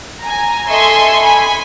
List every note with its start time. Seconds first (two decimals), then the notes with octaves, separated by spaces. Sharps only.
0.21 G#5 A#5
0.69 A4 D#5 E5 G#5 C6 C#6
1.22 G#5 B5